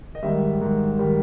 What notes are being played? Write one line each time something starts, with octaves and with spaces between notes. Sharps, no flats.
D#5
G#2 D#3 G3 E5
G#2 D#3 G3
D#3 G3